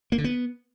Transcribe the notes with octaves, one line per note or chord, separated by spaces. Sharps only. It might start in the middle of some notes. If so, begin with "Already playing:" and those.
A#3
D3
B3